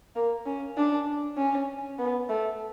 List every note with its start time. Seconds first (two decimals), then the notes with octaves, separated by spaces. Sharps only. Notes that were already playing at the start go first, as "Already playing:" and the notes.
0.16 A#3
0.46 C#4
0.77 D4
1.37 C#4
1.99 B3
2.29 A3